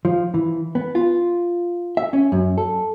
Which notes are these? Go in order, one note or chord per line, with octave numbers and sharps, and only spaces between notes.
F3
E3
B3
F4
E5
C#4
F#2
A4